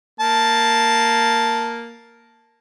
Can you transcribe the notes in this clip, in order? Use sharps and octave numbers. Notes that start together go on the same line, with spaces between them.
A#3 A5